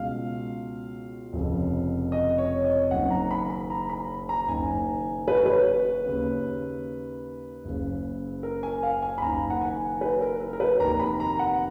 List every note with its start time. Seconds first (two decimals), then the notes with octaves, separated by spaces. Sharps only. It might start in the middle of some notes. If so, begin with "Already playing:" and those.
Already playing: C#2 B2 F5
1.33 F1 F2 C#3
2.12 D#5
2.38 C#5
2.65 D#5
2.91 F#1 F#2 D#3 F#5
3.10 A#5
3.31 B5
3.50 B5
3.70 A#5
3.89 B5
4.29 A#5
4.48 F#1 F#2 D#3 G#5
5.28 B4
5.37 C#5
5.46 B4
6.07 D#2 C#3
7.65 F#1 F#2 C#3
8.43 A#4
8.63 G#5
8.83 F5
9.02 G#5
9.18 B5
9.22 F#1 F#2 D#3 A#5
9.50 F#5
9.62 G#5
10.01 B4
10.21 A#4
10.40 A#4
10.53 A#4
10.60 B4
10.80 F1 D#2 D#3 A#5
11.00 B5
11.20 A#5
11.39 F#5